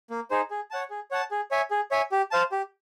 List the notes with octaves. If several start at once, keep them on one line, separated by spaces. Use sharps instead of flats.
A#3
D#4 G#4 C5
G#4
C#5 F#5 A5
G#4
C#5 F#5 A5
G#4
C#5 E5 G#5
G#4
C#5 E5 G#5
G4
C5 F5 A5
G4